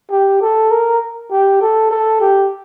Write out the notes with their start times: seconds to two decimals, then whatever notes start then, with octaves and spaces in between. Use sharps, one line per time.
0.11 G4
0.42 A4
0.71 A#4
1.31 G4
1.61 A4
1.91 A4
2.20 G4